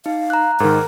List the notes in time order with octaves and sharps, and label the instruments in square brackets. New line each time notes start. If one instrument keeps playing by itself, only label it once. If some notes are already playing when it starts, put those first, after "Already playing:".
[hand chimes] D#4 [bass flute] F5
[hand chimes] A#5 F#6
[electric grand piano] G#2 D#3 [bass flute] A#4